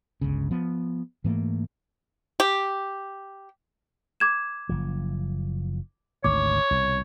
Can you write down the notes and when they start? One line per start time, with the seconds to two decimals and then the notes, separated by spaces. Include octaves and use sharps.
0.21 G1 C#2 C#3
0.51 F3 B3
1.24 G#2 E3 A3 A#3
2.40 G4
4.20 D6 G#6 E7
4.69 F#1 F3
6.24 G#1 D2 D#3 C#5 D6
6.71 C2 B2